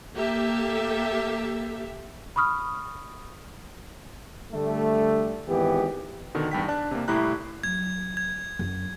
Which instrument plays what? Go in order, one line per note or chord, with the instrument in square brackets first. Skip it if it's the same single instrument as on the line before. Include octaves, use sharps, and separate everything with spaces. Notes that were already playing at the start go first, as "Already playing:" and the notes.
[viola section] A#3 G4 A4 E5
[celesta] B5 C#6 D#6 F6
[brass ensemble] D3 G3 A3
G#1 E3 B3 G4
[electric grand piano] B2 D3 D#3
E2 G2 G5 B6
D4 A5 F#6
C3 A#3
C2 A2 E4 G4 A#5 F#6
[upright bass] F#3 [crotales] G#6
[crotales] G#6
[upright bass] F#2